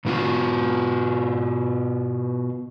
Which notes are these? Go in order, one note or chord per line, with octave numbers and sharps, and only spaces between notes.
B2 B3 D#4 F4 F#4